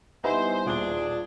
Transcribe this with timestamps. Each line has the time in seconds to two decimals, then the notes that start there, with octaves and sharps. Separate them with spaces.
0.24 G3 B3 D#4 E4 C5 G#5
0.66 D#1 D4 F4 G#4 G7